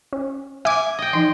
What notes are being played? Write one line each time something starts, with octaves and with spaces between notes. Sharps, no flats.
C#4
E5 G#5 D6
D#5 G5
E3 F3 D#4 C6